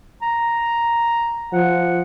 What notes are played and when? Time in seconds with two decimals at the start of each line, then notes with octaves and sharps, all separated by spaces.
0.22 A#5
1.53 F3 F#5